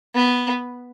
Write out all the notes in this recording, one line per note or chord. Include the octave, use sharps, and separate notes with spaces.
B3